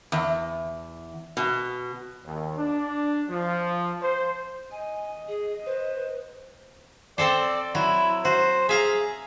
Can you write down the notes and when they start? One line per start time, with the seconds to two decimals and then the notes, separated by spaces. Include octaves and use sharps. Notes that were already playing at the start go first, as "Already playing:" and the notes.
0.12 E2
1.37 B2
2.24 D#2
2.57 D4
3.29 F3
4.02 C5
4.71 D#5 G#5
5.28 G#4
5.66 B4 C5
7.18 C4 A4 C5 D5
7.75 F#3 E4
8.25 F#4 C5
8.69 G#4 E5 F5 A#5